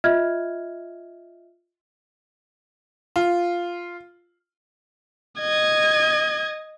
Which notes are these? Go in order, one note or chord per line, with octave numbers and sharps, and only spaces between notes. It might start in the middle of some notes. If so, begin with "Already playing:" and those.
F4 D#5 E5 F6 G#6
F4
D#5 G#6